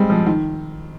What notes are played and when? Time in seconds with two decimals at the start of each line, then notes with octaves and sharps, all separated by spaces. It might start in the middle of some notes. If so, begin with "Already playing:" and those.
Already playing: G3 G#3 C4
0.10 F3
0.26 D#3